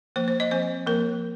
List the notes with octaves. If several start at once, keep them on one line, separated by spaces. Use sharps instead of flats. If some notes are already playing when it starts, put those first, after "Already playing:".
F3 A#3 C5
C5
D#5
F3 C4 C5
F3 A#3 A#4